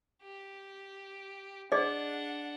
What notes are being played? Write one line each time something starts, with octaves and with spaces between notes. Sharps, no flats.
G4
D4 G#4 D5 D#5 F#5